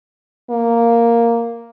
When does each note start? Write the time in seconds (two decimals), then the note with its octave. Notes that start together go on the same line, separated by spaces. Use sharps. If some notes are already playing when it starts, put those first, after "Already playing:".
0.50 A#3